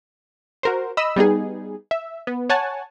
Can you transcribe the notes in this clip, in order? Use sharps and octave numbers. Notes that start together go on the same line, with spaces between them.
F#4 A#4 C5
D#5 B5 E6
G3 B3 D#4 G#4
E5
B3
C#5 F#5 G#5 A5